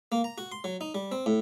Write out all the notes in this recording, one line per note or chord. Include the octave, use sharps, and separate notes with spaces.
A#3
A#5
F#4
C6
F#3
D#4
G3
C4
A2